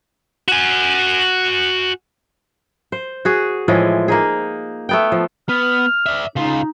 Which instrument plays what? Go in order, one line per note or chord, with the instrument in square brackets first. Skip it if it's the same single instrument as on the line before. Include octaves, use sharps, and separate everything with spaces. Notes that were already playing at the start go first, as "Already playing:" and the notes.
[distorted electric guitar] F#4 G#5
[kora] C5
F#4 G#4
A2 E3 F3 G#3
A#3 D#4 G#4
A3 B3 G5
F3
[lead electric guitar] B3 [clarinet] F6
[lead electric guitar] D5 E5
[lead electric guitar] C#3 F4 [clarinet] D#4